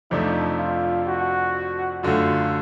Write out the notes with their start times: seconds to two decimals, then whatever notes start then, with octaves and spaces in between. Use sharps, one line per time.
0.11 F2 C3 F3 A3 D4 D#4
0.59 F4
1.07 F#4
2.03 F#2 D3 F#3 A3 F4